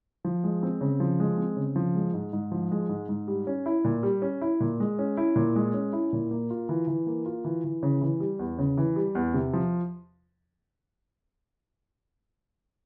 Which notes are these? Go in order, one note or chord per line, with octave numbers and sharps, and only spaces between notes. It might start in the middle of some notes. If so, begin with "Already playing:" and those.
F3
G#3
C4
C#3
F3
G#3
C4
C#3
F3
G#3
G#2
G#2
F3
G#3
G#2
G#2
G3
C#4
E4
A#2
G3
C#4
E4
A#2
G#3
C#4
E4
A#2
G#3
C#4
E4
A#2
A#3
F4
E3
E3
A#3
F4
E3
E3
C#3
E3
G3
E2
C#3
E3
G3
E2
C3
F3